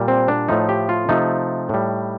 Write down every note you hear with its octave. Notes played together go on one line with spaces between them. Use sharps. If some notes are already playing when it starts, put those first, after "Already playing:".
Already playing: A#2 G3
C4
D4
A2 F3 A3 D#4
G4
F4
C3 F3 A3 D#4
A2 G3